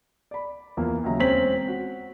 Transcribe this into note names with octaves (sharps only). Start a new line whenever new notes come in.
D5 B5
E2 F3 A#3
D#2 C#3 F#3 E5 A#5
E1 C4 C#4 C5 B6 F#7
F#4